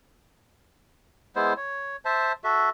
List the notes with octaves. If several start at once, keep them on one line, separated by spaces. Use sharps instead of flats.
G#3 B3 E4 C5
C#5
C5 E5 A5
F#4 A4 E5